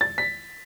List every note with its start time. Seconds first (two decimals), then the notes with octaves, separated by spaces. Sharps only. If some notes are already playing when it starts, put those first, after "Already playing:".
0.01 A6
0.18 B6